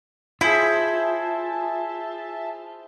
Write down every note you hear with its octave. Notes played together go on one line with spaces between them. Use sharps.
E4 F4 G#4 C5 E5 A5 B5